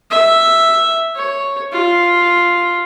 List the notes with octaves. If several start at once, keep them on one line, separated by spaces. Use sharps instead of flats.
E5
C#5
F4